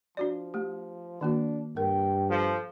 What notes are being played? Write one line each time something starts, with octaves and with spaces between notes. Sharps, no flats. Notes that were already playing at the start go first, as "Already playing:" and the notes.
F3 D4 F#4 D5
A3 G4
D#3 A#3 D4 F#4
G2 A#4 G5
F3 A4